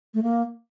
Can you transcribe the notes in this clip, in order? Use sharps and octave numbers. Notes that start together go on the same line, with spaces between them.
A3
A#3